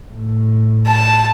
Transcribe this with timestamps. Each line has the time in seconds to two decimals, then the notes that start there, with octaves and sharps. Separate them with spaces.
0.14 A2
0.87 A5